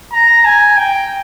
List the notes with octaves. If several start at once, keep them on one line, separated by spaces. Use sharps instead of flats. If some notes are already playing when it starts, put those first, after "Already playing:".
A#5
G#5
G5